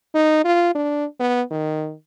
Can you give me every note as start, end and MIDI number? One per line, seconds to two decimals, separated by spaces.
0.15 0.43 63
0.45 0.71 65
0.75 1.06 62
1.20 1.43 59
1.51 1.94 51